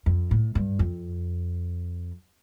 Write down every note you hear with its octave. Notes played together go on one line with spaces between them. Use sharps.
F2
A2
G2
F2